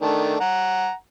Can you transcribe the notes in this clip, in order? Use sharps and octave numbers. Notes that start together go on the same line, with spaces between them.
D#3 A3 D4
F#5 A#5